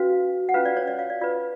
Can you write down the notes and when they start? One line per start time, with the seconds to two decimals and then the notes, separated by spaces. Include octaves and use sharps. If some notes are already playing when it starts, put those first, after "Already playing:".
Already playing: C#4 F#4 B4 F5
0.49 F#5
0.54 C#4 F4 B4 F5
0.65 D5
0.77 C#5
0.88 D5
0.99 F5
1.10 D5
1.21 F4 B4 D5